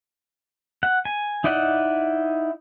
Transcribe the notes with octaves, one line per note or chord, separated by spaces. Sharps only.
F#5
G#5
D#4 E4 D5 D#5 F#5